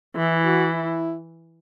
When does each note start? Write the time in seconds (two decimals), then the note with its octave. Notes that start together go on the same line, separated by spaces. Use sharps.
0.15 E3 E4
0.45 F#4
0.74 E4